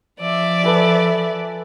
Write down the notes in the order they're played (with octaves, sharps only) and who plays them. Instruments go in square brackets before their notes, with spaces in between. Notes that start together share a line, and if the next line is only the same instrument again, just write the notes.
[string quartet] F3 D5 E5
[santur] A4 B4 G#5